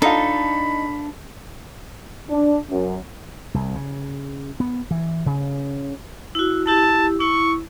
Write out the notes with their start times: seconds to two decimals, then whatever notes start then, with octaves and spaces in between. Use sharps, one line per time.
0.02 D4 D#4 F4 A4 B5
2.29 D4
2.69 F#2
3.54 C2
3.75 C#3
4.60 B3
4.91 E3
5.26 C#3
6.35 E4 F#4
6.67 E4 G4 A5
7.21 E4 C#6